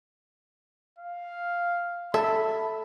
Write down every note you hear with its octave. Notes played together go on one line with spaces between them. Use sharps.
F5
A4 E5 B5